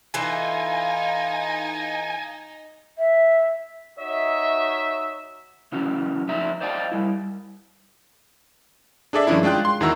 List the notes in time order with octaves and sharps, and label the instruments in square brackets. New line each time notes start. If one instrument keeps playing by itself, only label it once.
[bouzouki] E3 F4 A4 [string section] D#4 [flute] F5 [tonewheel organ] G#5
[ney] E5
[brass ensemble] D#4 F#4 C#5 D#5 E5
[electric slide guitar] C#3 E3 F#3 C#4
F2 D#4 E5 A#5
C5 D5 D#5 F5 G5 A5
G3 E4
[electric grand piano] D4 G#4 A4 D5 E5
G2 D#3 F3 C#4 D4 E4
G#3 D4 F4 G5 F#6
C6
E2 D#3 E4 F#4 A#5 E6